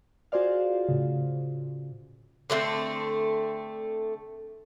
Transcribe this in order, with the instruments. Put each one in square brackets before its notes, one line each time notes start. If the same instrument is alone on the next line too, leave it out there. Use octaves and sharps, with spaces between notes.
[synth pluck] F4 F#4 G#4 C5 D5 F5
A2 C#3
[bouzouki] D3 A3 B3 C4